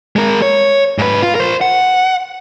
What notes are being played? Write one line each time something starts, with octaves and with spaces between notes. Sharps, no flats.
G#3 A#4
C#5
G#2 B4
F4
A#4 C5
F#5